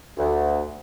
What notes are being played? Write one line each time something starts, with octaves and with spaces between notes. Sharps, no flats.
D2